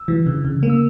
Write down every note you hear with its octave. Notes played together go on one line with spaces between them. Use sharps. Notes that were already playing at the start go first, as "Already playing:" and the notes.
Already playing: E6
E3
C#3
C#3
A#3
E6